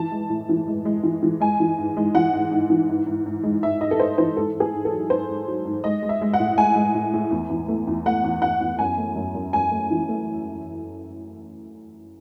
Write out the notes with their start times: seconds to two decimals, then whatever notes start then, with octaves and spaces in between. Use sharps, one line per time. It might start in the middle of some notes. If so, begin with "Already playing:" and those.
Already playing: E3 A5
0.12 G#3
0.30 A2
0.49 E3
0.68 G#3
0.85 G#3
1.03 E3
1.23 E3
1.40 G#3 G#5
1.60 E3
1.78 G#2
1.97 G#3
2.15 E3 F#5
2.33 G#2
2.51 G#2
2.70 E3
2.89 G#2
3.06 G#2
3.26 G#2
3.43 G#3
3.63 G#2 E5
3.80 G#2 D#5
3.91 A4
3.99 G#2 C5
4.18 E3 C5
4.36 G#2 A4
4.55 G#2
4.60 G#4
4.73 G#2
4.85 A4
4.91 F#3
5.10 G#2 C5
5.29 G#2
5.47 F#3
5.65 G#2
5.84 G#3 D#5
6.03 G#3
6.09 E5
6.21 G#3
6.33 F#5
6.40 A2
6.58 G#3 G#5
6.76 G#3
6.95 A2
7.14 A2
7.31 E2
7.50 E2
7.68 A3
7.87 E2
8.06 A3 F#5
8.24 E2
8.42 E2 F#5
8.61 E2
8.79 F#2 G#5
8.98 A3
9.16 F#2
9.35 F#2
9.53 F#2 G#5
9.71 A3
9.91 E3
10.09 A3